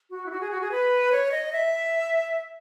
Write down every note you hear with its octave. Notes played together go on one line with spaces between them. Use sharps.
F#4
E4
F#4
G#4
F#4
G#4
B4
C#5
D#5
E5